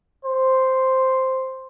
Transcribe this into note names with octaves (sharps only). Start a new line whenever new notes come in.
C5